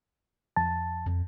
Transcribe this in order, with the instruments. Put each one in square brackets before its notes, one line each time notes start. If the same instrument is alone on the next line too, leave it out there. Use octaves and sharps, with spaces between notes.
[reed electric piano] F2 A5
[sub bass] F2